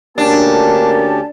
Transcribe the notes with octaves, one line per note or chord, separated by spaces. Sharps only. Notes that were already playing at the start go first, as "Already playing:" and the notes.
D2 A#3 C#4 D4 G4 A5